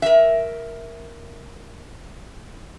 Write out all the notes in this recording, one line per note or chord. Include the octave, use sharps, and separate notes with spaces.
A#4 E5